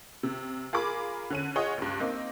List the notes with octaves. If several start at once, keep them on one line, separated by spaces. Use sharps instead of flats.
C3
F4 G#4 A#4 B5 D6
D3 C#4 D#7
F4 G#4 C#5 D#5 F#5 D#6
C#2 G2
A#3 C4 D#4